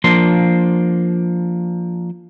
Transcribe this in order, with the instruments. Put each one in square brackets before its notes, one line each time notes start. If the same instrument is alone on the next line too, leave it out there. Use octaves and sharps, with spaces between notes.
[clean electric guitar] F3 A#3 D4 C6